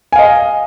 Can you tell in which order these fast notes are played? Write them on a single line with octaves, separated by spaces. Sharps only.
G#5 F5 D#5